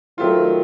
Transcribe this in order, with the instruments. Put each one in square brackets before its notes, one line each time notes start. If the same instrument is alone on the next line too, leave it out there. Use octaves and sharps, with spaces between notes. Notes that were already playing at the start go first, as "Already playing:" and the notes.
[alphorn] D#3 [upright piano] F#3 A3 C4 F4